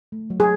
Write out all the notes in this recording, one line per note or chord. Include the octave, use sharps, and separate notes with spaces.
A3
F#3
G#4